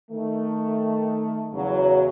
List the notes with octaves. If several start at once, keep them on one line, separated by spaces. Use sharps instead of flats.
D#3 A3
E2 C#3 F#3